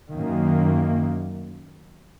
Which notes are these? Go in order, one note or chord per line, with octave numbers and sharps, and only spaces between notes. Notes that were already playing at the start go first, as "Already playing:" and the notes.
F#2 D#3 A#3